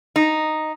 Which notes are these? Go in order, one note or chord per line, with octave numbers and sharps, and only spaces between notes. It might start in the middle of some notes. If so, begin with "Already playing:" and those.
D#4